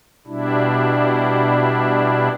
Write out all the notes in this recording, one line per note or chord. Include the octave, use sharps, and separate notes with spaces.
B2 G3 D4 E4